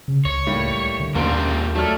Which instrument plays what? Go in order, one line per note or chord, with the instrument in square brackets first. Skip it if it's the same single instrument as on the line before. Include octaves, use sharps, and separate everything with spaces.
[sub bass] C#3
[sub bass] C#2 [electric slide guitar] C#5
[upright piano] A2 G3 A#3
[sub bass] D3
[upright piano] F#1 D4 D7 [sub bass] D#2 [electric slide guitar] A#3 F4 G4
[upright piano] F#3 D5 F6 [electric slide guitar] A3